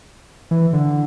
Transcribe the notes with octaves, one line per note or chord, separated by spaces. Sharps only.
E3
D3